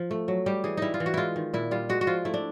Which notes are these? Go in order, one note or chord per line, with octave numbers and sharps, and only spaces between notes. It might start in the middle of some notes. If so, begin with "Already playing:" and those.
Already playing: F3 F4
A3
F#3
G3 G4
E3 G#4
G3 D#4 E4
F4
E3
F#4
G#3 E4 F4
D#3
A#2 E4
G3 F4
G#3 F#4
F#4
F3 F4
A3 E4
D4